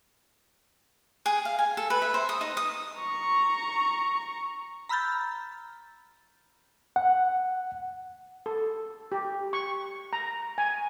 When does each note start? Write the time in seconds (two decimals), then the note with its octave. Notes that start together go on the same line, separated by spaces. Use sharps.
1.26 G#4
1.45 F5
1.59 G#5
1.77 A4
1.90 B4
2.02 E5
2.14 C5
2.29 D#6
2.41 D#4
2.57 D#6
2.98 A#5 C#6
4.89 A#5 B5 E6 F6 G6 A6
6.96 F#5
8.46 A4
9.12 G4
9.53 C#6
10.13 A#5
10.58 G#5